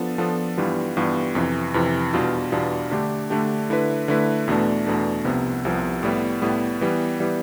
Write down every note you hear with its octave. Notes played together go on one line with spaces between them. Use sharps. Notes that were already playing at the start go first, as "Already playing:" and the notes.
Already playing: F3 B3 D4 A4
F3 B3 D4 A4
G2 E3 G3 B3 F4
G2 E3 G3 B3 F4
F2 C3 E3
F2 C3 E3
E2 B2 G3 D4 F4
E2 B2 G3 D4 F4
D3 A3 D4 G4
D3 A3 D4 G4
D3 A3 E4 B4
D3 A3 E4 B4
E2 B2 A3 D4
E2 B2 A3 D4
C2 C3 F3 B3
C2 C3 F3 B3
A2 G3 B3
A2 G3 B3
E3 G3 B3
E3 G3 B3